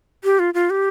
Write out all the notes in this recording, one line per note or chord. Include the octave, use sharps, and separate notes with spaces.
G4
F4
F4
G4